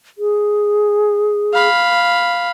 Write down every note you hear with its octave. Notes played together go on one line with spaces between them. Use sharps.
G#4
F5 B5